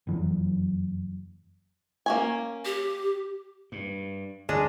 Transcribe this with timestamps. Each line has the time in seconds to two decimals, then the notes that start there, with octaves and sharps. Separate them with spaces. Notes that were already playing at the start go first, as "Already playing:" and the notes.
0.07 F#1 F2 E3 F#3
2.06 A#3 C#4 G#5
2.65 G4
3.72 G2
4.49 G1 D2 G#3 D4